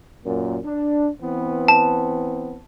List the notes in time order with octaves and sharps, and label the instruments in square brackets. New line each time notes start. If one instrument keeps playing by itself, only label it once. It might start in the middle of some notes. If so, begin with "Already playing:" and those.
[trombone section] F#2 A#2
D4
E3 B3 C4
[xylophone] A5